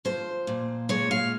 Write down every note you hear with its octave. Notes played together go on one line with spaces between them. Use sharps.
F3 C5
A#2
G#3 C#5
F5